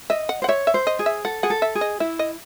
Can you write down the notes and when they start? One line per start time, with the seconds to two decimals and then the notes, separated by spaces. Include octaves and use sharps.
0.10 D#5 E5
0.29 F#5
0.42 C5 F#5
0.48 C#5 E5
0.67 E5
0.74 C5
0.87 D#5
0.99 G#4
1.06 E5
1.25 A4 F#5
1.43 G#4 F#5
1.50 A4
1.62 E5
1.75 G#4
1.81 D#5
2.00 E4 E5
2.19 D#5